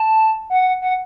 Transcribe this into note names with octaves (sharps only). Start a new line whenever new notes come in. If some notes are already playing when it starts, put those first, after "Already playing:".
Already playing: A5
F#5
F#5